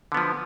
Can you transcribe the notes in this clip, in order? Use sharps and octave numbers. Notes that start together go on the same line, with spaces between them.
D3 F3 B3